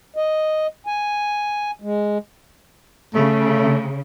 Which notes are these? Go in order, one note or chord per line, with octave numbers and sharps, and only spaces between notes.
D#5
G#5
G#3
C#3 A3